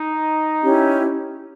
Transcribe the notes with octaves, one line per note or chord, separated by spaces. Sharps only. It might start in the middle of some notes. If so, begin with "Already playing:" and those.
Already playing: D#4
C#4 E4 G4